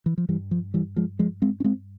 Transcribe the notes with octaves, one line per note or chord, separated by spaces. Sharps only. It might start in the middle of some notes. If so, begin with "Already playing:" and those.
E3
F3
G2 E3 G3
F3
E3 G3
F3 G#3
F3 G#3
G#3 C4
C#4
G#3 C4